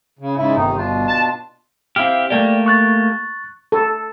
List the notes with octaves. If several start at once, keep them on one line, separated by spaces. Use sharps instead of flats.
C#3
G#2 C#3 E4
G1 C3 D#3 D#4
B2 D4 F4
A5
C4 E4 G4 F5 F6
A3 A#3 G4 D5 G5
C#6 F#6 A6
A4